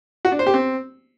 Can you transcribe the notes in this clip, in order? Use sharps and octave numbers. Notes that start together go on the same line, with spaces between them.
F#4
D4
C5
G4
C4